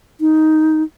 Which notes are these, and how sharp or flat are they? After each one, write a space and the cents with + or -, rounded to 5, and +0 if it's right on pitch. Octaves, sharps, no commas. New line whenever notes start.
D#4 +10